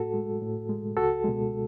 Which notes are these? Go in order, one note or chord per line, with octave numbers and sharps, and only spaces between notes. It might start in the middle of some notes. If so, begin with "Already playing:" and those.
Already playing: A2 F#4 A4
G#3
A2
G#3
C#2 F#4 A4
B2 G#3